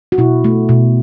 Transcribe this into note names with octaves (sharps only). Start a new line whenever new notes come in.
F#4
B2 E4
A3
B2